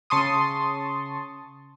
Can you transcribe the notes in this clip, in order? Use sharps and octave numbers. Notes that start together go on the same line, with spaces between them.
C#3 A5 C6 C#6 D#6